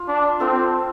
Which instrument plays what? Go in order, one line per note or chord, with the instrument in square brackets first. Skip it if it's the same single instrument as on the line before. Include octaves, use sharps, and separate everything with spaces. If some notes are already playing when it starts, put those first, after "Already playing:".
Already playing: [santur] F4
[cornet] D4
[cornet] C4 [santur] F4 A4